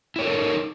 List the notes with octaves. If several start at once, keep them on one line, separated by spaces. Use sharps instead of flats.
D#4 E4 A4 A#4 C#5